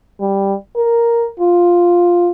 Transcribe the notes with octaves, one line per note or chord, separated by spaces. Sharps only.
G3
A#4
F4